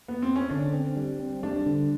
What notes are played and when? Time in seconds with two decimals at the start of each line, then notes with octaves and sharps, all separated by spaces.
0.08 B3
0.22 C4
0.36 C#4
0.50 D3 D4
0.73 C4
0.96 G3
1.19 C4
1.43 G3 D4
1.66 D3